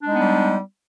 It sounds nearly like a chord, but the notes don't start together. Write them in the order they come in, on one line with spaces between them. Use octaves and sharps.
D4 G#3 D#4 B3 G3